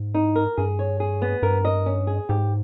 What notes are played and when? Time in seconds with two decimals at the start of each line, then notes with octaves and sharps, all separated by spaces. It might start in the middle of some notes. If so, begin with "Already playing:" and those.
Already playing: G#2
0.14 D#4
0.36 A#4
0.57 G2 G#4
0.79 C#5
1.00 G#4
1.22 B3
1.42 G2 A#4
1.65 D#5
1.86 C#4
2.07 G#4
2.29 G#2 G4